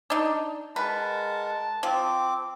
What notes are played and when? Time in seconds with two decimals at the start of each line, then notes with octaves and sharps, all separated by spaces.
0.10 D4 D#4
0.76 G#3 A#4 B4 F#5 A5
1.83 F3 C4 D6